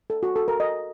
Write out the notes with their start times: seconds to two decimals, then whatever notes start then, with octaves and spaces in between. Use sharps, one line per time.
0.10 A4
0.23 F#4
0.36 A4
0.48 A#4
0.60 D#5